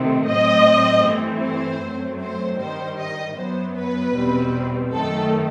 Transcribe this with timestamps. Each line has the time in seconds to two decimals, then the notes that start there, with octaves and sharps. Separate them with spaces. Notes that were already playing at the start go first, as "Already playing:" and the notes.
Already playing: C3 D#3 A3 C4
0.25 A2 F#3 C4 D#5
1.03 G2 E3 A3 C4
1.42 C5
1.81 F#2 F#3 A3 C4
2.21 C5
2.59 G2 D#3 G3 C5
2.98 D#5
3.37 F#2 F#3 B3 C5
3.76 B4
4.15 E2 B2 G3 C4
4.93 F#2 D#3 A3 A4